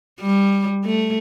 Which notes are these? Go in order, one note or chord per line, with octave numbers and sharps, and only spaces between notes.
G3
A3